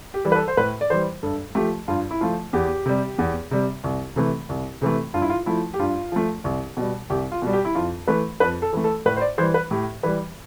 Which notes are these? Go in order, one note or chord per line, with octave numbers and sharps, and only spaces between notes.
G4
E3 G3
B4
A4
C5
A2 B4
D5
E3 G3 C5
G2 A4
F3 A3 G4
G2 F4
E4
F3 A3 F4
E2 G4
C3 G3
E2
C3 G3
C2
C3 E3 A3
C2
C3 E3 A3
G2 F4
E4
F4
F3 A3 E4
G4
G2 F4
F3 A3
C2
B2 G3
C2 G4
F4
B2 G3
G4
E4
F2 F4
E3 A3 B4
F2 B4
A4
E3 A3
A4
A2 B4
C5
D5
E3 G3 C5
B4
A2 G4
E3 G3 B4